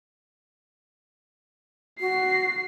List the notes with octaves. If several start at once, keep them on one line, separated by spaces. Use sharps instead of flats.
F#4 C7